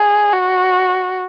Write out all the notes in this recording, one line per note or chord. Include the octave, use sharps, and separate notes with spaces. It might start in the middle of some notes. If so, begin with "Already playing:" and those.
Already playing: G#4
F#4